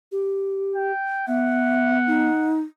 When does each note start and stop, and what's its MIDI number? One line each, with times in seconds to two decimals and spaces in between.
0.12 0.91 67
0.75 1.23 79
1.27 2.29 59
1.27 1.98 76
1.27 2.56 78
2.07 2.61 63